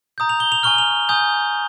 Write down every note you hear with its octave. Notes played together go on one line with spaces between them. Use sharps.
A#5 D#6 G6
F7
G7
F7
G#5 C#6 F6 G7
F7
G#5 D#6 G6